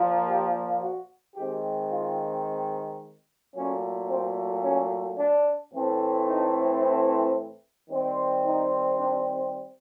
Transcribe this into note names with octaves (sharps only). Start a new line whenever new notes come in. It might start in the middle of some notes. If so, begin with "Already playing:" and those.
Already playing: A#2 F3 A#3
G4
F#4
D#3 G#3 C4 G4
F4
A#2 F#3 A3 C#4
C4
C#4
D4
A2 E3 A3 C4
D#4
E4
D#3 G3 C4
D#4
D4